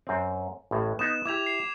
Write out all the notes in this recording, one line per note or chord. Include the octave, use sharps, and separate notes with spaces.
F#2 C4
A1 A2
B3 D#4 E7
E4 G4 D6 G#6 F7
C7